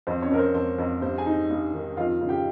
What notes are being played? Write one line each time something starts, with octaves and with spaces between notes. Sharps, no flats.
F2 C5
C#4 C#5
F2 A#4
C5
F2 C5
F2
G2 C5
G#4 G#5
D#4
G2
D#3
F2 F4 F5
C#3
G4 G5